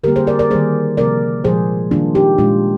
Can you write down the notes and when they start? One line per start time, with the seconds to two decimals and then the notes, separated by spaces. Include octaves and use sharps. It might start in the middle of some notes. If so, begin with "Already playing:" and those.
0.04 D3 G3 A#3 G4 A#4
0.16 G#4 C5
0.27 A#4 D5
0.39 A#4 D5
0.50 D#3 G3 A#3 G#4 C5
0.97 C3 F3 A#3 A#4 D5
1.44 A#2 F3 G#3 G#4 C5
1.91 D#3 G3 A#3 D4 F4
2.15 D#4 G4
2.38 A#2 G#3 D4 F4